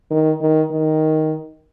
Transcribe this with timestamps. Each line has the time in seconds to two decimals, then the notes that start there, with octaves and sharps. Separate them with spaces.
0.10 D#3
0.41 D#3
0.71 D#3